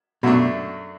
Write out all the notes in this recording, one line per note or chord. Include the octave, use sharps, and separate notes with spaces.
F#2 B2 F#3 A3 D4